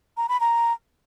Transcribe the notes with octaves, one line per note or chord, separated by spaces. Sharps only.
A#5
B5
A#5